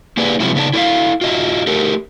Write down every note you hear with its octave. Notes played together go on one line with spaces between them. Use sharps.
A#3 G4 G#4 B4 D5
C3 F3 F#3 G#3 B3 E4
C#3 B3 D#4 D5 A5
E4 A4 C#5 D5 E5 F5
F4 F#4 D#5 E5
A3 G4 A#4